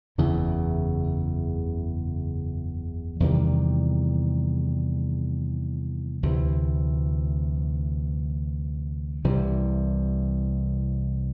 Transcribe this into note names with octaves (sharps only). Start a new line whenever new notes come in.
F#1 E2 C#3 E3
E2 C3 D#3 G3
D2 C3 E3
C2 C3 E3 G3